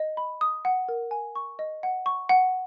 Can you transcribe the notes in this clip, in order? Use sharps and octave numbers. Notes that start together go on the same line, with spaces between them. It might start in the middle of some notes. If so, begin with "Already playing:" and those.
Already playing: D#5
B5
D#6
F#5
A#4
G#5
C#6
D#5
F#5
C#6
F#5